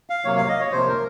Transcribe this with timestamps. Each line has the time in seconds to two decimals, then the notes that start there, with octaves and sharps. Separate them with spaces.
0.10 F5
0.25 C3 F#3 A#3 C#5
0.36 F5
0.49 D#5
0.60 C#5
0.72 C3 F3 A#3 C5
0.88 A#4